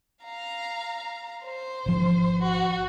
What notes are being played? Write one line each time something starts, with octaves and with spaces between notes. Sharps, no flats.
F5 A#5
C5
G#1 F3
F#4